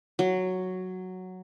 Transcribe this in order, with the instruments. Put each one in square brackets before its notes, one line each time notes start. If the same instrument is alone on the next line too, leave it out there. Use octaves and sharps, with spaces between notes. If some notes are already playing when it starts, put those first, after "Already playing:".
[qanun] F#3